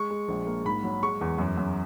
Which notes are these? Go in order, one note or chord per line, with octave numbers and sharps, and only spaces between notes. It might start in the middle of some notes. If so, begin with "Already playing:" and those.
Already playing: G#3 C#6
G#3
A#1
A#3
G#2 B5
F#3
G#3 C#6
E2
F#2
F#2